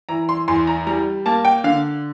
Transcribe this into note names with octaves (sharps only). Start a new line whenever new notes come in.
E3 A#5
C6
E2 C6
A#5
G3 A#5
A#3 A5
G5
D3 F5